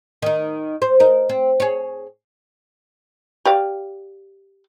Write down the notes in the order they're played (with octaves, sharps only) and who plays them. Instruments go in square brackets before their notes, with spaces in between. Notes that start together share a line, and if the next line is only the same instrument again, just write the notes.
[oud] D#3 D#4
C5
D#4 A#4
C4
G#4 C#5
[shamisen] G4 D5 F5